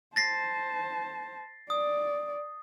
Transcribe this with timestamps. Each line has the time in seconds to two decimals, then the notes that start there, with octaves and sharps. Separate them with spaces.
0.16 C5 A5 A6 A#6 C7
1.70 D5 D#6